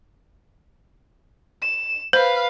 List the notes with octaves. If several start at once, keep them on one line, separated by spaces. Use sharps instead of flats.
E7
B4 C5 F5